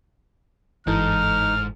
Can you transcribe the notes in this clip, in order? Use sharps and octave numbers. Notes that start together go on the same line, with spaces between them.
G1 G#2 E3 D#4 A4 F6